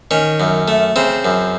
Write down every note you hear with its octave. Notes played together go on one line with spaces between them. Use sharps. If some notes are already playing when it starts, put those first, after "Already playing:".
D#3 C#4
F#2
A3
C#3 C4
F#2